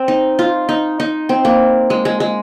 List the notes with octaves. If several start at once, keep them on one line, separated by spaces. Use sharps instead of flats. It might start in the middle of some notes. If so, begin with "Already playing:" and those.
Already playing: C4
D#4
F4
D#4
D#4
C4
A#3
G#3
G#3
G#3